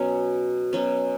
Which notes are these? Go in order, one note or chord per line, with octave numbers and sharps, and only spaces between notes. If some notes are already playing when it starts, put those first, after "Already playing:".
Already playing: B2 F#3 C#4
B2 F#3 C#4